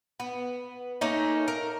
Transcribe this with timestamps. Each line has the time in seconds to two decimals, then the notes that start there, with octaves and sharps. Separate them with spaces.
0.20 B3
1.01 A3 A#3 C#4 D#4
1.48 A#4